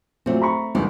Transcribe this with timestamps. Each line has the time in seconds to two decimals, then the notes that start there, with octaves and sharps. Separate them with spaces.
0.26 A#2 F#3 A3 C4
0.42 A#5 B5 C#6
0.75 G1 C#2 D#3